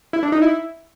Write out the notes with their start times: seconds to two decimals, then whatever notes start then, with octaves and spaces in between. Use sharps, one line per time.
0.13 E4
0.23 D4
0.32 D#4
0.42 E4